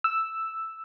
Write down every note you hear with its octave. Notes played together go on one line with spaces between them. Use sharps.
E6